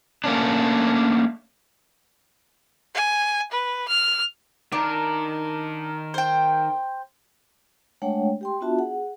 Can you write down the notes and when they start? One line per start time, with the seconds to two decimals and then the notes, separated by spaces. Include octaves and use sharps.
0.24 A3 A#3 C#4 D4
2.95 G#5
3.52 B4
3.88 F6
4.72 D#3 D4 A#4
6.14 C5 G5
8.02 G#3 A3 D4 C#5 F#5 G5
8.41 G4 G5 C6
8.61 B3 D4 F4 F#4 E5 A5
8.78 G#4 F#5